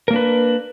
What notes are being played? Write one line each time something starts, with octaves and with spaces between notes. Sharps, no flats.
A#3 D4 A#4 B4